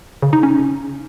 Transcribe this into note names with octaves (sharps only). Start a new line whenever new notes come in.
C#3
D#4
C#4